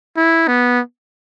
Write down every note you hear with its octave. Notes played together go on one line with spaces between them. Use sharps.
E4
B3